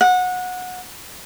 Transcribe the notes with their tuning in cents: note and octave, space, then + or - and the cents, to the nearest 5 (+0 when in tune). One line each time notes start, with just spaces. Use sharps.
F#5 -20